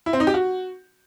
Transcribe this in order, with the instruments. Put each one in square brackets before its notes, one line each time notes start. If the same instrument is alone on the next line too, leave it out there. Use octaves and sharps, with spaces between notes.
[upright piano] E4
C4
D#4
G4
F#4